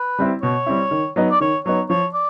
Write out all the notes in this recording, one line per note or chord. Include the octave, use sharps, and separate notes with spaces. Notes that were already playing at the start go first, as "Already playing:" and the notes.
Already playing: B4
G3 C4 E4
B2 C#5
G3 C4 E4
D#3
F#3 B3 D#4
D5
D#3 C#5
F#3 B3 D#4 C#5
F3 C#5
D5